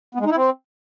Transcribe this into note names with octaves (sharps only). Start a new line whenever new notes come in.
B3
G#3
D#4
E4
C4